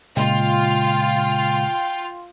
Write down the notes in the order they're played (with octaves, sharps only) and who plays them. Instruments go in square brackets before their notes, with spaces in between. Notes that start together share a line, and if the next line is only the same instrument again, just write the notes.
[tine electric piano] A#2 C#3 G#3 [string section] F4 [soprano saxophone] G5